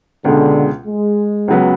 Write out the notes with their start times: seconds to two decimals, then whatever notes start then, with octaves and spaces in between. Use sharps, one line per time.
0.24 C#2 B2 D3 G#3
0.86 G#3
1.48 C#2 C#3 F#3 B3